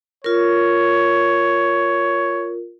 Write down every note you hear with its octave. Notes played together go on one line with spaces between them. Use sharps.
F4 A#4 C#5